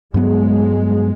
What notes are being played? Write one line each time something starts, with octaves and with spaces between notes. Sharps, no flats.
G2 F#3 G#3 B3